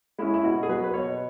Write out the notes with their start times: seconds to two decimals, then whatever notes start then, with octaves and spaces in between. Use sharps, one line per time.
0.19 G#3 C#4 E4
0.34 E4
0.43 B2 F#4
0.63 G#4
0.69 F#3 B3 B4
0.84 B4
0.93 B2 C#5